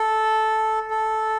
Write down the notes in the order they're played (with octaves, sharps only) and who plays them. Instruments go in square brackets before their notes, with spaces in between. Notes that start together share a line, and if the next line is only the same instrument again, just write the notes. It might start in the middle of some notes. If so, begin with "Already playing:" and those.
Already playing: [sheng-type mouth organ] A4
A4